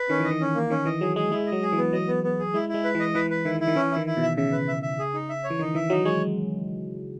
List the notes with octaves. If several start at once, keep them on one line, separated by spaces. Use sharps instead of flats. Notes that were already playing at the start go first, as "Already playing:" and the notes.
Already playing: B4
D#3 C#4
E3 D#5
D#3
C#4
A#3
D#3 C#4
E3 D#5
F#3 G#4
G#3 G#4
G#3 E4
D#5
F#3
G#4
E3
B3
F#3 D#5
B3
B3
G#4
G#3 E4
E4
G#3
B4
E3 D#5
E3 B4
B4
D#3 E4
E4
D#3
E3 C#4
E4
D#3
E4
B2
E5
C#3 E5
B4
E5
E5
G#4
D#4
E5
C#5
E3
D#3 D#4
E3 E5
F#3 D#4
G#3 C#5